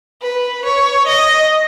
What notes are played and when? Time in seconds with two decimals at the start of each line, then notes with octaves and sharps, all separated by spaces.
0.22 B4
0.65 C#5
1.07 D#5